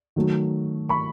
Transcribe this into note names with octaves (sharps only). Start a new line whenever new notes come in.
D#3 F#3 A3
B5 C#6